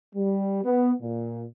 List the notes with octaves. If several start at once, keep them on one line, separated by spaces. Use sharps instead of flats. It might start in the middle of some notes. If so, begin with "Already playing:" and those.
G3
B3
A#2